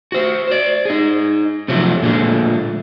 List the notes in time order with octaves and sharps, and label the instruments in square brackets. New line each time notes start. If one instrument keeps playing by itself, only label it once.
[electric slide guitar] F#4 C5
C5 D5
D#4 G#4
C3 F3 F#3 A3
A#2 D3 G#3 A3